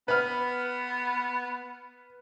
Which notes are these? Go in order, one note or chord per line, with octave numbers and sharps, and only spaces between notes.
B3 B4 F6